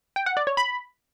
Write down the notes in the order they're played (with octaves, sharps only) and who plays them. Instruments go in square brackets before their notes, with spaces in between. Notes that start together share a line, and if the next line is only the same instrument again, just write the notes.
[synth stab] G5
F#5
D5
C#5
B5